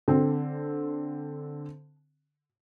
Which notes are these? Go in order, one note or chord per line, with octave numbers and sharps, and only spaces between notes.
D3 C4